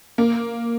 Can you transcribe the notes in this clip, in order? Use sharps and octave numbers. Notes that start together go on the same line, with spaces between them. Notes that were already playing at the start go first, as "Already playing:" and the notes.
A#3